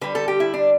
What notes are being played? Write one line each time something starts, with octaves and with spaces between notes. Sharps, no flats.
D3 G3 B4
A4
G4
E4
D4